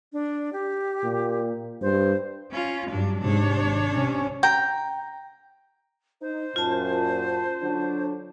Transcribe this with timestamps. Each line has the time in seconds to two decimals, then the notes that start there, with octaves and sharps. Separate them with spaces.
0.13 D4
0.53 G4
1.04 A#2
1.82 G2 C5
2.52 C#4 F4
2.91 G2 F#3 D4
3.21 G#2 C3 D4 C#5
3.61 G#1
3.93 C3 C#4
4.43 G5 A#5
6.21 D#4 C5
6.56 F#2 A#2 F4 A5
7.63 D3 F#3 D4